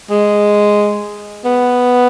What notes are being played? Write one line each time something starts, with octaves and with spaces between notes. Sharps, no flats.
G#3
B3